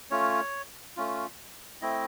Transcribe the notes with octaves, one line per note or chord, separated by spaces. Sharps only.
A3 C#4 F4 C#5
A3 C#4 F4
A3 C4 E4 D#5